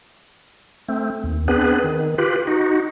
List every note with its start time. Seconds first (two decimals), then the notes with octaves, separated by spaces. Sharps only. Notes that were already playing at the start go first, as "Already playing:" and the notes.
0.89 A3 C4
1.24 D#2
1.48 B3 C4 D4 G#4 B4
1.84 D#3
2.18 F4 G4 B4
2.47 D#4 F#4